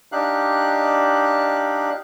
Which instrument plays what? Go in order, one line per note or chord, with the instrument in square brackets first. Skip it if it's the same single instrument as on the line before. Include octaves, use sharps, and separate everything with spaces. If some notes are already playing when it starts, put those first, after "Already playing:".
[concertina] D4 D#4 G4 F5 F#6